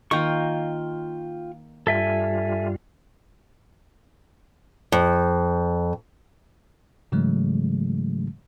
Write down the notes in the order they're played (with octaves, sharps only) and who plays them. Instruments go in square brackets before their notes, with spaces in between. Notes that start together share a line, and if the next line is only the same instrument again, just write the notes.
[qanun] D#3 A#3 [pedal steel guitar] F4 G5 C#6
[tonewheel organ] G2 G3 F4 [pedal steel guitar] A4 E5 G#5
[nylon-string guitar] F2
[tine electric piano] G#2 C#3 E3 F#3 G#3 A3